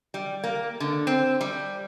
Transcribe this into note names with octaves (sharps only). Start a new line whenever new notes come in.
G3
A#3
D3
C4
G3